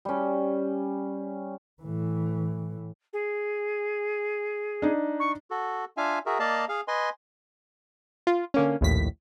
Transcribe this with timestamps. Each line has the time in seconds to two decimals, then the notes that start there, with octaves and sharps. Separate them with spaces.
0.05 G3 C#4
1.83 A2 E3
3.13 G#4
4.82 D4 D#4
5.19 C#6
5.51 F#4 A4
5.97 D4 F4 E5 F5 G#5
6.26 F#4 G#4 A#4 E5
6.40 A#3 D5 D#5 F5 A5
6.69 G#4 F5
6.88 B4 D#5 G#5 C6
8.27 F4
8.54 D3 A#3 C#4
8.81 A#1 D#2 A2 B6